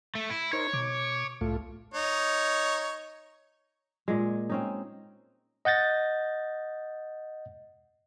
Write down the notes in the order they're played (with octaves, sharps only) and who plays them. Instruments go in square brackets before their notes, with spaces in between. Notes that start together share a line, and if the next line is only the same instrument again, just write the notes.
[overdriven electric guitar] A3
E4
[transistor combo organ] D#4 A#4 C5 [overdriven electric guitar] C#5
[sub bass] B2 [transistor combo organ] D6
[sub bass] C2 [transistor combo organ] A2 A3 F4
[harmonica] D#4 C#5
[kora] A#2 G#3
C4 C#4 D#4
[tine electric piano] D#5 F#5 G6 A6 A#6